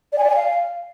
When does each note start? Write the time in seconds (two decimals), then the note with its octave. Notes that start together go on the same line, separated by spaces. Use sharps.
0.12 D5
0.18 G#5
0.24 D5
0.30 G#5
0.35 F5